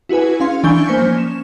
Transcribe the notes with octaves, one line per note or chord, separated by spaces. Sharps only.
E4 F#4 G#4 B4 G#5
C#4 F5 C6
E3 D4 G#5 C#6 G6 G7
A#3 C5 G#5 B6 C#7
F3 C#4
E7